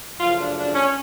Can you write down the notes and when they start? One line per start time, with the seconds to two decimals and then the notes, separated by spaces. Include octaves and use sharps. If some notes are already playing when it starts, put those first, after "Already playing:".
0.19 F#2 C#3 F3 A3 F4
0.38 D4
0.57 D4
0.74 C#4